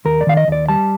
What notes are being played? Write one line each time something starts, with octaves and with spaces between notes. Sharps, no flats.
D#2 A#4
D5
D#3 F5
D#5
D#2 D5
G3 A5